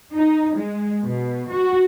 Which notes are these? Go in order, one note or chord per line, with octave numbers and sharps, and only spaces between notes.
D#4
G#3
B2
F#4